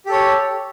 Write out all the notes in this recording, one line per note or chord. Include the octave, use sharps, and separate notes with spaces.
G4 A4 C#5